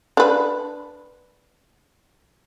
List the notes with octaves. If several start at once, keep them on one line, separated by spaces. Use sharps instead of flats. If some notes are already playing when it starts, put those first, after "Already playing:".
D4 B4